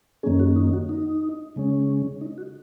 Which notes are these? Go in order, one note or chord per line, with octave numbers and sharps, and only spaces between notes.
F#2 D#3 A#3 C#4 G#4
F#4
D#4
F#4
D#4
C#3 G#3 C#4
D#4
F#4